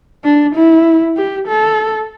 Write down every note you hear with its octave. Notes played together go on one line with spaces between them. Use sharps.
D4
E4
G4
A4